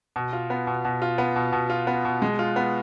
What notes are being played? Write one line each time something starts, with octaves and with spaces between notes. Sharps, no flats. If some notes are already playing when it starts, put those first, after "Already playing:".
B2
F4
B3
B2
B2
F4
B3
B2
B2
F4
B3
B2
G#3
F4
B3